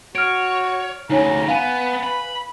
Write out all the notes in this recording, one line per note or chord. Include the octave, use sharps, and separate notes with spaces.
F#4 C#5 F6 D7
D2 C#3 D#4 C#5 G#5 A#5
B3 B4 F5 G#5 D#7
B5